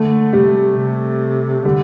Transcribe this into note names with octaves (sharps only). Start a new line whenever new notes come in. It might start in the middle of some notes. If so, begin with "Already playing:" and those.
Already playing: D3 A3
C3 G3
C3
D3 G3